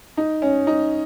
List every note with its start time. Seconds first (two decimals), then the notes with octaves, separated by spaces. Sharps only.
0.17 D#4
0.42 C#4
0.67 D#4